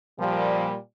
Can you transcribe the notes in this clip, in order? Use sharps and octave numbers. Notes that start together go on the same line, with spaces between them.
A#2 F3 G3